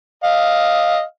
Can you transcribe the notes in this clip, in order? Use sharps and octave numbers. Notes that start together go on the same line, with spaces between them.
D#5 F5